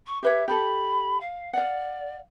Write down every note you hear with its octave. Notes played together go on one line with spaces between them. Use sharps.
C#6
G4 B4 C#5 E5
G4 A4 B5
F5
D5 F5 F#5